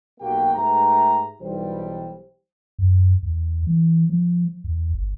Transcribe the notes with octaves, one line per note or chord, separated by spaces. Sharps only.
B1 A#3 F#4 G4 G5
G#2 A3 G4 B4 A#5
B1 E3 G3 C5
F#2
E2
E3
F3
E2
G1